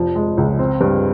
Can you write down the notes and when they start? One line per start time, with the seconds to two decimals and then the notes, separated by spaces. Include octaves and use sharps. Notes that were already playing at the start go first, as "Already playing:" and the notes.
Already playing: F1 F3
0.15 G#3
0.37 C#2
0.59 C4
0.81 G2